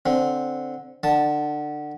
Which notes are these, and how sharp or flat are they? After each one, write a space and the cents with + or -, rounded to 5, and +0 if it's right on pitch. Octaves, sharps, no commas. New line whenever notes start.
D3 +0 C4 +0
D3 +25 A5 +0